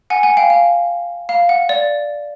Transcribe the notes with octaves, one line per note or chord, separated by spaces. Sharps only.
F#5 G#5
F#5 G#5
F5 G5
F5
F5
F#5
D5